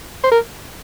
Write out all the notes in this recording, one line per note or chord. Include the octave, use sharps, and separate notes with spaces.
C5
A#4